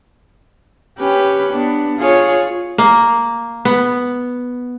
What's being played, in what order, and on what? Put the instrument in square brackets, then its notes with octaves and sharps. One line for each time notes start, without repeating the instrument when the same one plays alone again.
[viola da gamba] C#4 G4 B4
B3 D4
F4 G#4 C#5
[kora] A#3
B3